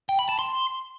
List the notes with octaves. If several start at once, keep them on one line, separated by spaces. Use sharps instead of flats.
G5
B5
A5
C6